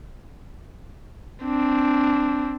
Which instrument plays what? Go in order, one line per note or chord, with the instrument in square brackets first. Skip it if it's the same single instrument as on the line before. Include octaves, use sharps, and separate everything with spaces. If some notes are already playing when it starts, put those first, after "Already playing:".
[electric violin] C4 D4